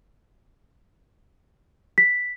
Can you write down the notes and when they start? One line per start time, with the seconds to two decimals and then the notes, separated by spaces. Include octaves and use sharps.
1.98 B6